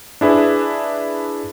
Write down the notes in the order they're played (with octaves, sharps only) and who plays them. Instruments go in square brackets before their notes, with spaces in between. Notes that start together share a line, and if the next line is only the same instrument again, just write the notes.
[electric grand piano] D4 E4 G#4 B4